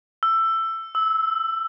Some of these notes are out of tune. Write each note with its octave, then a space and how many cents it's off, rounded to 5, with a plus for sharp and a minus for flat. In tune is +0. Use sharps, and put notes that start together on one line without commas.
E6 +15
E6 -15